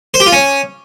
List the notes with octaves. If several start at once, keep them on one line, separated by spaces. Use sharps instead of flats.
C5
G4
F4
C#4